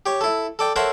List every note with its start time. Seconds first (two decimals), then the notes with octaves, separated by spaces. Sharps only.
0.06 G4 C#5
0.21 E4 A4
0.59 A4 D5 G5
0.76 A4 A#4 C5 C#5 E5 F#5